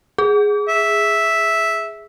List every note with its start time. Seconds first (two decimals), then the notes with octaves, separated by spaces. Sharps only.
0.18 G#4
0.69 E5